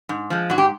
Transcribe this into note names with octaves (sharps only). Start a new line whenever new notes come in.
G#2
F3 G#3
G#2 F#4
G4